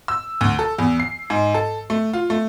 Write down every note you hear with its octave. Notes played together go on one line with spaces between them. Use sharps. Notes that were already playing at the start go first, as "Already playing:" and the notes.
E6
D2
A4
E2
C7
G#2
A4
A3
F4
A3